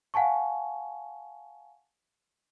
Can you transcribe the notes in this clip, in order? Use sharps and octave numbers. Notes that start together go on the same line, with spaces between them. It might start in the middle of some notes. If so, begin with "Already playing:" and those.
F5 F#5 G#5 A5 C#6